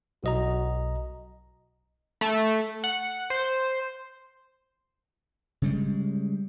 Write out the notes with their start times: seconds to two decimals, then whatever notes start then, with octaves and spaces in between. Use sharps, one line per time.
0.24 B1 F#4 D#5 A#5
2.21 A3
2.84 F#5
3.30 C5
5.62 C#3 G3 G#3